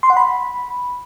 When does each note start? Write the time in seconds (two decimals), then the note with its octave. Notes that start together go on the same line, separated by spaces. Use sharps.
0.03 C6
0.10 F#5
0.17 B5